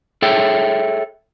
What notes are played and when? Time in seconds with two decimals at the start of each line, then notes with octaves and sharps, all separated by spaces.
0.22 G#4 A4 C#5 E5 G5